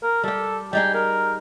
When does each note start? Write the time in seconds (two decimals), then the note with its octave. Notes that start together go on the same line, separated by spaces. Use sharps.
0.03 A#4
0.24 G3 G4 A4
0.73 G3 D#4 G#4 G5
0.94 A#4